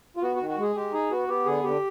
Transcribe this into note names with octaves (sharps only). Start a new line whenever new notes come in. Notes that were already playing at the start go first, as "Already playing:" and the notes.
F4
B3 F#4
F#4
D#3
F#4
G#3 G#4
G#3 G4
D#4 G#4
B3 F#4
B3 G4
D3 G#4
D3 G4